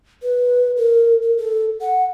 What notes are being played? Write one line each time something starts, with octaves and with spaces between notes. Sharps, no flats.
B4
A#4
A#4
A4
F#5